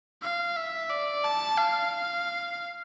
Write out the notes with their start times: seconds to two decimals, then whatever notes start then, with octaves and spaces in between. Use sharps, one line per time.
0.22 F5
0.56 E5
0.90 D5
1.24 A5
1.58 F5